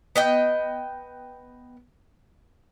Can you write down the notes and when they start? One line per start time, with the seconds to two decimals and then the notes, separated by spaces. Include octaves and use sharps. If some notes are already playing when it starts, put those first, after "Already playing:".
0.16 B3 D#5 G5